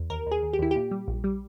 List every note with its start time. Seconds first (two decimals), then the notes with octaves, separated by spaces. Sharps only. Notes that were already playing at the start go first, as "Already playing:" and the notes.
Already playing: E2
0.10 D#2 A#4
0.26 D#2
0.32 G#4
0.43 D#2
0.53 G4
0.59 D#2 E4
0.71 A#2 G4
0.91 G3
1.08 A#1
1.24 G3